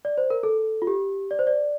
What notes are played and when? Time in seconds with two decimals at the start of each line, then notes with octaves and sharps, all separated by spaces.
0.05 D5
0.18 C5
0.30 A#4
0.43 A4
0.82 F4
0.87 G4
1.31 D5
1.39 C5
1.47 D5